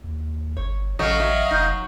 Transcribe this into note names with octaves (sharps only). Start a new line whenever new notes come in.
D#2
G1 C#5
A1 C#3 F#3 A4 D#5 F5
F#3 C#5 E5
F1 D#4